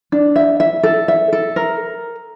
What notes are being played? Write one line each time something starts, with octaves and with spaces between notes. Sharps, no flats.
D4
E5
E5
A4
E5
A4
A#4